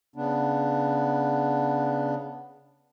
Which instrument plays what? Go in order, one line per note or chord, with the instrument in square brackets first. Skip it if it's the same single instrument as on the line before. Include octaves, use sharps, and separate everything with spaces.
[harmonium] C#3 B3 D4